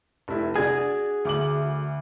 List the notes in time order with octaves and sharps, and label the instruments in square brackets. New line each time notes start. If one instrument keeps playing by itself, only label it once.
[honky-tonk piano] F1 E4
[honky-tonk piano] D4 G#6 [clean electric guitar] F#4 G#4
[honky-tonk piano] D2 D6 F#7